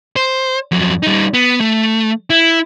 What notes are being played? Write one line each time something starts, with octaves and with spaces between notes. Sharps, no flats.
C5
F2 F#3
G3 D#4
B3
A3
E4